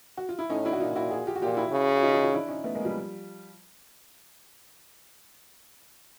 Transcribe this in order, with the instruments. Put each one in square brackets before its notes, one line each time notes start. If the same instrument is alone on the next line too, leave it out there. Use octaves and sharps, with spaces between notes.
[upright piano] F#4
F4
E4
[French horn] A2 [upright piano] C#4 D#4
[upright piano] D4 E4
F#4
[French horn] A#2 [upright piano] D#4 F4
[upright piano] E4 F#4
F#4 G#4
F4 G4
F#4
[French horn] A#2 [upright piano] F4 G4
[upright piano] E4 F#4
[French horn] C#3
[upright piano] F#4
D#4 F4
D#4 F4
D#4 F4
D4 E4
C#4 D#4
A3 B3
G#3 A#3
F3 G3